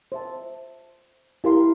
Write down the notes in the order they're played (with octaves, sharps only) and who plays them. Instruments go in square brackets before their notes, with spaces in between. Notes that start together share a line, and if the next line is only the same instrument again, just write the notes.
[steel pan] C5 E5 A5
E4 G4 A#4 F5 C6